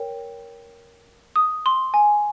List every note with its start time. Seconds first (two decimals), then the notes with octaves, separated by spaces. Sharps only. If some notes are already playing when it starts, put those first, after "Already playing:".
Already playing: A#4 C#5 G5
1.36 D#6
1.66 C6
1.94 G#5